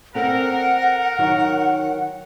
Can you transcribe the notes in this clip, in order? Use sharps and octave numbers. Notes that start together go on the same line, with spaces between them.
C4 A4 A#4 D5 F#5
D#3 F#3 D#4